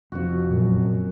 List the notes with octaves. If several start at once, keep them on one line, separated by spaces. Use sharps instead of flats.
F1 F2 F#4
F#2 A#2